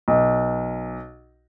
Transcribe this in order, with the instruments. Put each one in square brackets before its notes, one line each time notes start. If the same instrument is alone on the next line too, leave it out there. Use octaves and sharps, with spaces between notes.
[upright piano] B1